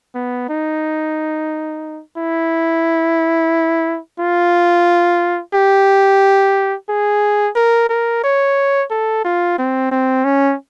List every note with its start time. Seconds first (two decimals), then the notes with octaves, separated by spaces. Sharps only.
0.15 B3
0.49 D#4
2.17 E4
4.20 F4
5.54 G4
6.89 G#4
7.56 A#4
7.89 A#4
8.24 C#5
8.91 A4
9.25 F4
9.58 C4
9.91 C4
10.25 C#4